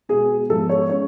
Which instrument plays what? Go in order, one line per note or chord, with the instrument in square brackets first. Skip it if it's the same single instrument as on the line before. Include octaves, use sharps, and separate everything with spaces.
[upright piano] B2 G#3 B3 G#4
G#2 F3 B3 A4
C#5
G#3 C#4 C#5